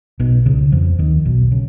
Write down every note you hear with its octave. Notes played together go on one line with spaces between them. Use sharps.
B1 B2
C#2 C#3
F2 F3
D#2 D#3
B1 B2
C#3